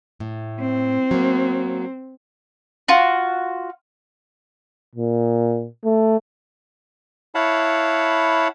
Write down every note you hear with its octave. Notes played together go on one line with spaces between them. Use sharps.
A2
C4
F#3 A#3
F4 F#4
A#2
A3
E4 C#5 F5 F#5 A5 B5